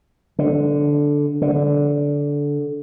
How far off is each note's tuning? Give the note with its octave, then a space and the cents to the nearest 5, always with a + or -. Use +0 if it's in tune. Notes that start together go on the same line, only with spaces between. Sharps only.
D3 -5
D3 -15